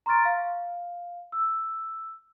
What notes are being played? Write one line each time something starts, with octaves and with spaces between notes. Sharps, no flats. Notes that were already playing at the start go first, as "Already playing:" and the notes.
A#5 C6 C#6 F6 A6 D7
F5
E6